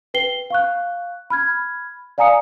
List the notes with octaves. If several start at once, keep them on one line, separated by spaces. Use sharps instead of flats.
B4 G5 C7 G7
F5 C#6 F#6
B5 F6 G#6
D5 F5 G#5 A#5 D#6 C#7